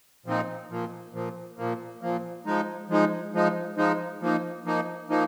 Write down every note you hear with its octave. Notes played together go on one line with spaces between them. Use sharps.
A#2 F3 C4 D#4
A#2 F3 A#3
A#2 F3 A#3
A#2 F3 A#3
A#2 F3 A#3
F3 G#3 D#4
F3 G#3 D#4
F3 G#3 D#4
F3 G#3 D#4
F3 A#3 D#4
F3 A#3 D#4
F3 A#3 D#4